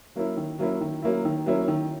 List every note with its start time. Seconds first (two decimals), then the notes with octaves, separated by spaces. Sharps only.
0.16 F#3 A#3 C#4 E4
0.37 D#3
0.59 F#3 A#3 C#4 E4
0.81 D#3
1.02 F#3 A#3 C#4 E4
1.25 D#3
1.46 F#3 A#3 C#4 E4
1.68 D#3